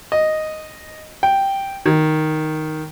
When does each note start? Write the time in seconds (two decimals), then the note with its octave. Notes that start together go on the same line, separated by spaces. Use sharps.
0.12 D#5
1.23 G5
1.86 D#3